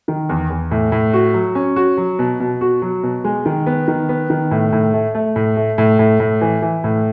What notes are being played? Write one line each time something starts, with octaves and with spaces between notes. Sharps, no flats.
D#3
E2
E2
A2
A2
F#4
F#3
C#4
F#4
F#3
B2
B2
F#4
F#3
B2
G#3
D#3
B3
D#3
B3
D#3
A2
A2
A3
A3
A2
A3
A2
A2
A2
E3
E3
A2